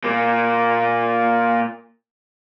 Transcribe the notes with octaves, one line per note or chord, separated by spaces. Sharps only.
A#2 A#3